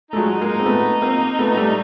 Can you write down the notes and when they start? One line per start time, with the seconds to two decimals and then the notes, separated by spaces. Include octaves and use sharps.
0.11 A3 D#4
0.16 F#3 G#3
0.29 D#4
0.41 G#3 A#3
0.47 D#4
0.60 C4
0.66 A3 B3
1.02 A#3 C4
1.39 A3 B3
1.56 G3 A3